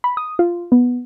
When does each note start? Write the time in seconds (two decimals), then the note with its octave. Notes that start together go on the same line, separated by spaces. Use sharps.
0.04 B5
0.17 D#6
0.39 F4
0.72 B3